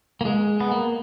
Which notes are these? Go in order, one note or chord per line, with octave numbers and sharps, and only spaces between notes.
A#3
G#3
B3
A#3